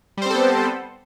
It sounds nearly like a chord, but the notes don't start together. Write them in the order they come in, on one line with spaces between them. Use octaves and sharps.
G3 C5 C4 A4 B3